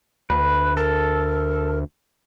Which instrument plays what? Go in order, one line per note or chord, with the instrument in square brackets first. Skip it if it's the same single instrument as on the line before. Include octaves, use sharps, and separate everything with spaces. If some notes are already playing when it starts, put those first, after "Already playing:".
[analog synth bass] D2 [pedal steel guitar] B4
[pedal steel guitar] A4 [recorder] A#4